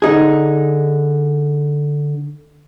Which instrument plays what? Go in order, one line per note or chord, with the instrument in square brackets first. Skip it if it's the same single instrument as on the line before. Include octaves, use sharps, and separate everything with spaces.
[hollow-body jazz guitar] D3 D#4 G#4